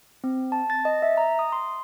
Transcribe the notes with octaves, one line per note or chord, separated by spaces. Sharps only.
C4
A5
A6
D#5
E5
A#5
D#6
C6